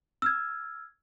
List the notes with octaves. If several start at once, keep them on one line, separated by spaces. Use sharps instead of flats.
E6 F6 G#6